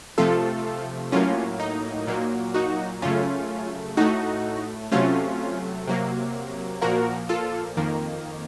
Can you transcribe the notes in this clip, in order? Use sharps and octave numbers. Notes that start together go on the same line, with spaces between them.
C3 F3 A3 F4 A4
A2 F#3 A#3 C#4 F4
D#4
A#2 F#3 A#3
D#4 F#4
F#2 C#3 A3 C#4 F4
A2 A3 D#4 F#4
C3 F#3 A3 C#4 F4
C3 F#3 A#3
A#2 F3 A#3 F#4 A#4
F4 A4
F2 D#3 A#3